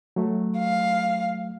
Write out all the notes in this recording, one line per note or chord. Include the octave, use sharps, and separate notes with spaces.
F#3 A3
F5